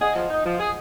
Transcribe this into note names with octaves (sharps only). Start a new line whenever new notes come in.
G#4 D#5 F#5
F3
D#4
F3
G#4